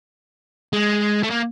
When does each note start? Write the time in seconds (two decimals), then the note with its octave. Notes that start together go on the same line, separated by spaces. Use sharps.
0.73 G#3
1.23 A3
1.30 A#3